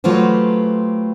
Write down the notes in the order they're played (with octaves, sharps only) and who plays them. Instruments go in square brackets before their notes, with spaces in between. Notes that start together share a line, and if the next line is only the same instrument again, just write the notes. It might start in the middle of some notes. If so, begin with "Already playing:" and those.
[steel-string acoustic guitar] F#3 A3 F4 G4 B4 C5